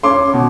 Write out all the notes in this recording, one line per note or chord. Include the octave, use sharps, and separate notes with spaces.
C#4 C6 D6
B2